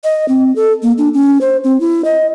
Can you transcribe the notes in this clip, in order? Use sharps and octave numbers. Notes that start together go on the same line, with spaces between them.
D#5
C4
A4
A#3
D4
C#4
C5
C4
E4
D#5